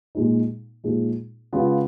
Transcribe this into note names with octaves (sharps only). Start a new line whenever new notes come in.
A#2 G#3 D#4
A#2 F3 G#3 D#4 G#4
C#3 G#3 B3 F4